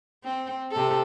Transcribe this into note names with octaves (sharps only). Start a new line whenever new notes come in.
C4
C3 A4